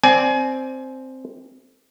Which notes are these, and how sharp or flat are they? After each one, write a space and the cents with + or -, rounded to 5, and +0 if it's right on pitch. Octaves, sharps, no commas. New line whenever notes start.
C4 +0 D5 +0 G#5 +25